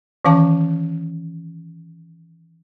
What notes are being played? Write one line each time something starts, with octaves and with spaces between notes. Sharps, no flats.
D#3 E3 C#4 F5 A5 D6